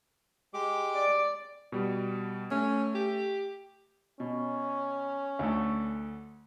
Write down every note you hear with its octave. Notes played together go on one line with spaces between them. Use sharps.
G#3 G4 D6
D5
B2 G3
A3 C#4
G4
B2 C#4
D2 A3